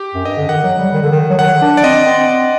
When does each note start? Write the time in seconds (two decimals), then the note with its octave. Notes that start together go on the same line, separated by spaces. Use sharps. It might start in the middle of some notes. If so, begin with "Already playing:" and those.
Already playing: G4
0.14 F#2
0.25 G2 D#5
0.37 D3
0.48 D#3 F#5
0.64 F#3
0.79 G3
0.93 D#3
1.03 D3
1.11 D#3
1.30 F#3
1.39 D#3 F#5
1.62 D4
1.77 D5
1.84 C4 D#5
2.06 C4